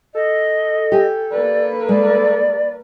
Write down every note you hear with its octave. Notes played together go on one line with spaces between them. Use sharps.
A4 D#5
G4 G#5
A#3 B4 D5
G#3 D5